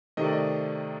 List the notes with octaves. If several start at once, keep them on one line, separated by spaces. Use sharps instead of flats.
C3 D#3 A3 D#5
D5
D#5